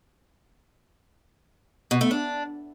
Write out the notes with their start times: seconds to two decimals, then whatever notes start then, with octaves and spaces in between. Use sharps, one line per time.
1.91 B2
2.01 A3
2.11 D4